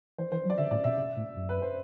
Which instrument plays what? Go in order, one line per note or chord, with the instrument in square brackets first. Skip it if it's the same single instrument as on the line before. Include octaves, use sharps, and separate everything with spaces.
[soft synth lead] E3 [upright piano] C5
[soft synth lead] E3 [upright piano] C5
[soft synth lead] F#3
[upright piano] D5
[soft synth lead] D3 [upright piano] E5
[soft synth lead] A2 [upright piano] D5
[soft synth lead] B2 [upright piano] E5
[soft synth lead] C3
A2
F#2
[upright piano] B4
C5